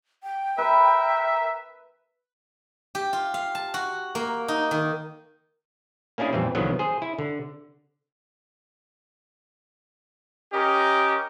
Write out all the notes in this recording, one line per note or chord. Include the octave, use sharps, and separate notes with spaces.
G5
A#4 B4 E5
G4
F4
F5
A5
F#4
A#3
D#4
D#3
A#3 C#4 D4 E4 G#4
F2 A#2 E3 G3 C4
C2 D3 D#3 F3 F#3 B3
G#4 C5
E4
D3
C#4 G4 A#4 D#5